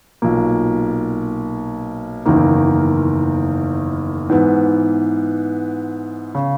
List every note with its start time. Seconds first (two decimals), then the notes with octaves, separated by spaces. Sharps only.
0.22 B1 A#2 A#3
2.26 F#1 E2 D#3 A#3
4.29 G#2 E3 B3
6.35 C#3